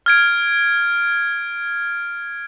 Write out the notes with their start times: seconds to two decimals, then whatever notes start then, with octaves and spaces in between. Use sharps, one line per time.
0.06 F6 G#6 D7